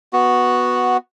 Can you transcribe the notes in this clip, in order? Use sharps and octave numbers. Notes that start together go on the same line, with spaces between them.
B3 F#4